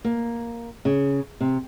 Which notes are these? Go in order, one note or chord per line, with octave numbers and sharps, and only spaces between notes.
A#3
C#3
C3